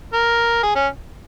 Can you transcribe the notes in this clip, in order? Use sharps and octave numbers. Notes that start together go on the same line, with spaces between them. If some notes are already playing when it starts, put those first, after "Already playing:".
A#4
G#4
C#4